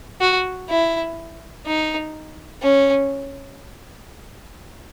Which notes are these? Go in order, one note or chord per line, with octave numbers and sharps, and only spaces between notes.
F#4
E4
D#4
C#4